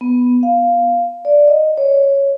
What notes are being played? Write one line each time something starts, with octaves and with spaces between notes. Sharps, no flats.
B3
F5
D5
D#5
C#5